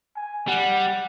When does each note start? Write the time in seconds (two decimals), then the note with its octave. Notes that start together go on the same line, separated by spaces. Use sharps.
0.16 G#5
0.48 G3 F#5